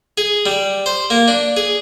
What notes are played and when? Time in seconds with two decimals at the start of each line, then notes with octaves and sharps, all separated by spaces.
0.17 G#4
0.46 G3
0.86 C5
1.10 A#3
1.28 D4
1.57 G#4